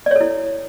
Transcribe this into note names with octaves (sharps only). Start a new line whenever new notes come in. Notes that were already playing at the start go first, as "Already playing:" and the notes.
E4 A4 C#5 D5